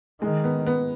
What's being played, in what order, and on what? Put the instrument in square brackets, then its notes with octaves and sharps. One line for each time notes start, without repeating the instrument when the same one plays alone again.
[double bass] D#3 [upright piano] G#3
[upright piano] B3
B3